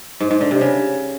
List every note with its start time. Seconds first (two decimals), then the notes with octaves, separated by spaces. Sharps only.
0.20 G#2
0.31 G#2
0.41 D3
0.51 C3
0.61 C#3